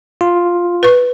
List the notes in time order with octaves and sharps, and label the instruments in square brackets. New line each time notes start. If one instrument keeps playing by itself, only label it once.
[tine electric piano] F4
[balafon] B4 C#6